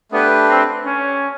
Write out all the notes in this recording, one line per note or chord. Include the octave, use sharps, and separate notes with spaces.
A3 B3 D4 G4 B4
C4
C#4